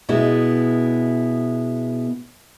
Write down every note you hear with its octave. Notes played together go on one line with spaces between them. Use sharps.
B2 G#3 B3 E4